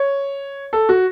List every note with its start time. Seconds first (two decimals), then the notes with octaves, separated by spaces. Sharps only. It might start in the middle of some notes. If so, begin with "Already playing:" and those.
Already playing: C#5
0.73 A4
0.89 F#4